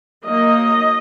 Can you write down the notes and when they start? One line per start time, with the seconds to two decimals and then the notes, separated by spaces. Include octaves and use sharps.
0.24 F#3 A#3 D#4 D#5